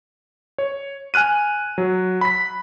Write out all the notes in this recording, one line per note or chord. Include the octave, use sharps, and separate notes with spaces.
C#5
G#5 F6 F#6 D#7
F#3
B5 B6